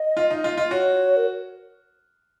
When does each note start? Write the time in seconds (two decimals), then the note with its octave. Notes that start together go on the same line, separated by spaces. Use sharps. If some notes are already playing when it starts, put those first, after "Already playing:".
Already playing: D#5
0.17 F4
0.31 D#4
0.44 F4
0.57 F4
0.71 F#4 C#5
1.17 A#4